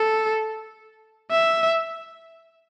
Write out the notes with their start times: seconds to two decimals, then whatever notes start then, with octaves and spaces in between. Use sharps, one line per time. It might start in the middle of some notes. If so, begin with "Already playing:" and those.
Already playing: A4
1.31 E5